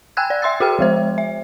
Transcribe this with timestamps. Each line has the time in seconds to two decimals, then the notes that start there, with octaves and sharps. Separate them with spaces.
0.17 G5 G#5 E6 F#6 G#6
0.30 D5
0.42 E5 C6 E6 A6
0.60 F#4 G#4 G5 F6
0.79 F3 G#3 C5
1.18 E5